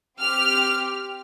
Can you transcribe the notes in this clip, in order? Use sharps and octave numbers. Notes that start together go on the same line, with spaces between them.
C4 G4 F6